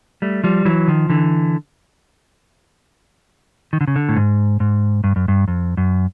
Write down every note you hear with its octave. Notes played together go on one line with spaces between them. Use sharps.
G3 A3
F3 G3
E3 F#3
D#3 F3
D3 E3
D#3
D3
C#3
D3
A2
G#2
G#2
G2
F#2
G2
F2
F#2